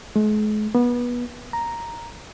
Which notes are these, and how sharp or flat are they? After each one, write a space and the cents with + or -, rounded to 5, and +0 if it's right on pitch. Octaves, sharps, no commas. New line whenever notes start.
G#3 +40
B3 -25
A#5 +0